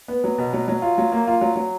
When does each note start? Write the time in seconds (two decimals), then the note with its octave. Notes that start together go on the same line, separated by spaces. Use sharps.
0.08 B3
0.24 F#3
0.38 B2
0.53 F#3
0.68 F#3
0.82 F4
0.98 F#3
1.12 A#3
1.27 F4
1.41 F#3
1.56 F#3